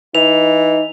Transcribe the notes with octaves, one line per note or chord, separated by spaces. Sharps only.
E3 D#4 F7